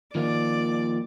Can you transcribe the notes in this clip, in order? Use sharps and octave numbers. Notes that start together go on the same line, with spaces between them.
D#3 F3 A#3 D5